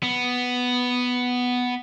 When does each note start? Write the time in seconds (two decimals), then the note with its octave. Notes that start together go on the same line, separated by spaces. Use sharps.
0.03 B3